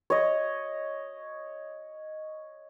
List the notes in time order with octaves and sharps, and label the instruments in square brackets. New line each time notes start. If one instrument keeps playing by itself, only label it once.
[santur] C#5 D#5